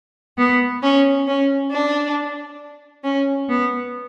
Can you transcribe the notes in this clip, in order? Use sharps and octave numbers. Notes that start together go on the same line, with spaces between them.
B3
C#4
C#4
D4
C#4
B3